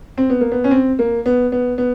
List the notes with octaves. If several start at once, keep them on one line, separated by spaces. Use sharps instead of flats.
C4
B3
A#3
B3
C#4
C4
A#3
B3
B3
B3